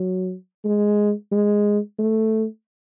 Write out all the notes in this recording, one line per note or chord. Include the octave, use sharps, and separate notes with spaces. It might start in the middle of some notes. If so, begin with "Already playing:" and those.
Already playing: F#3
G#3
G#3
A3